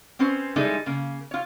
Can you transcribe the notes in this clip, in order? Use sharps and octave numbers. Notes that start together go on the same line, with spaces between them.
C4 C#4 B4 C5
E3 G3 G#3 D#4 G#4 A4
C#3 A#3
F4 C#5